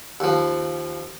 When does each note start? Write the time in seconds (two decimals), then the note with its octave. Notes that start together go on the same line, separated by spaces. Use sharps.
0.20 D#2 F3